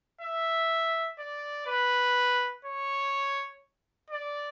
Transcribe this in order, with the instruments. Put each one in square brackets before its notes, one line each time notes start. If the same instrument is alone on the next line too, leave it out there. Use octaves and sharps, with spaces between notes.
[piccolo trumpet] E5
D5
B4
C#5
D5